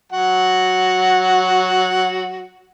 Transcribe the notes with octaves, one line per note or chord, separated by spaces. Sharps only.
F#3 F#4 F#5